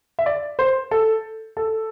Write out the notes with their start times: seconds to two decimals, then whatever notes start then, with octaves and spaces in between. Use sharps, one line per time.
0.19 E5
0.26 D5
0.59 C5
0.91 A4
1.57 A4